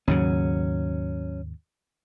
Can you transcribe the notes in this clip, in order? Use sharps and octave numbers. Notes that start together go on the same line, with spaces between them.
D#2 G#2 C#3 F#3 C#4